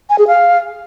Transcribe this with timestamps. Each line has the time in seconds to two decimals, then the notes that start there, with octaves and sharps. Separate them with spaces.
0.10 G#5
0.19 G#4
0.27 F5